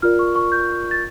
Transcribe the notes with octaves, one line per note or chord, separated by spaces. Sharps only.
F4 A#4 D5 F6
C#6
C#6
G6
A6